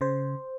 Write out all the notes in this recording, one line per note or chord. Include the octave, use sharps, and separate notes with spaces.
C#3 C5